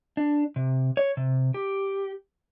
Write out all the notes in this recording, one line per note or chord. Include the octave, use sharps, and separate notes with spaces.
D4
C3
C#5
C3
G4